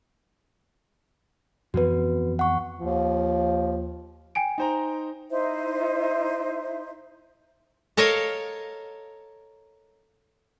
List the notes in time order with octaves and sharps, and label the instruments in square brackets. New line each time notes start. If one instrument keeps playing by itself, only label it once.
[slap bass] F2 E3 B3 [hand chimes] F#4 B4
[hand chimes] F#5 C#6
[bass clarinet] D#2 [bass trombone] F3
[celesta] G5 G#5 D7
[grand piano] D#4 C5 A#5
[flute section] D#4 E4 C5 E5
[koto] A4 A#4 C#5 D#5 F5